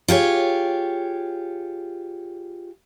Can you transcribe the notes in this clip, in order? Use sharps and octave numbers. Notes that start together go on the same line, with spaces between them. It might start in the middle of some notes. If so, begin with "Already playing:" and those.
F4 G4 G#4 C#5